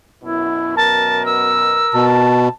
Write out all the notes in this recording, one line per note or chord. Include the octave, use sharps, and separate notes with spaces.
F#2 B2 E4
A#4 A5
E6
B2 A5